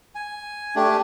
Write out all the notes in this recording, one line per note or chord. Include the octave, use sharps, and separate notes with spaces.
G#5
A3 D4 G4